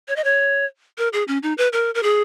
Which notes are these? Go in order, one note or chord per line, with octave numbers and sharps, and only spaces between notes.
C#5
D#5
C#5
A#4
G#4
C#4
D#4
B4
A#4
A#4
G#4